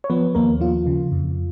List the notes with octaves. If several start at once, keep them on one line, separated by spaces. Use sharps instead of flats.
C#5
F3 B3 B4
D#2 A#3 A#4
F3 F4
C#3
F2